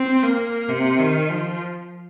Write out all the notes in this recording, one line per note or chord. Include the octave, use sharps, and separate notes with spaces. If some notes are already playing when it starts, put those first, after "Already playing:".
Already playing: C4
A#3
C3
D#3
F3